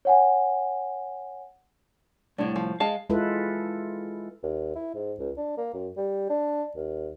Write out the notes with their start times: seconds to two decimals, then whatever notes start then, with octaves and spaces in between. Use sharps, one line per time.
0.05 C#5 F#5 G#5
2.38 C2 A2 D4
2.56 F3
2.80 G#3 F5 A5
3.10 G#3 E4 F4 A4 B4
4.43 D#2
4.76 E4
4.95 G#2
5.19 C#2
5.37 D4
5.57 A#3
5.74 F#2
5.97 G3
6.29 D4
6.76 D#2